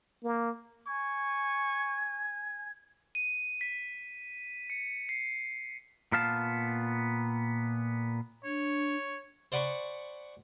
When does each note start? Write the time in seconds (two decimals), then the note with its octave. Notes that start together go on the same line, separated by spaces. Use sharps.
0.23 A#3
0.87 G#5 C#6 G#6
3.15 D#7
3.61 B6
4.70 C#7
5.09 C7
6.12 A#2 B3 F5 A5
8.44 D4 C#5
9.52 C5 D5 F#5 G#5 B5 C#6